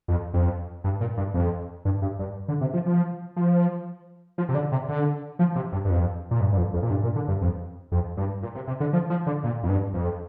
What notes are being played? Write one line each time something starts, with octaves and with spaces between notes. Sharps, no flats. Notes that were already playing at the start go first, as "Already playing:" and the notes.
F2
F2
G2
A#2
G2
F2
G2
G2
G2
D3
C3
F3
F3
F3
F3
C3
D3
C3
D3
F3
C3
G2
G2
F2
A#2
G2
G2
F2
F2
A#2
G2
A#2
D3
G2
F2
F2
G2
A#2
C3
C3
D3
F3
F3
D3
A#2
F2
G2
F2